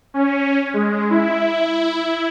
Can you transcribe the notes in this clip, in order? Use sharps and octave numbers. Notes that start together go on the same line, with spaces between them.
C#4
G#3
E4